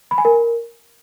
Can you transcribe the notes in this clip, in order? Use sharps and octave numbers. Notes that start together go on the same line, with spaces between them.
B5
G#5
A#4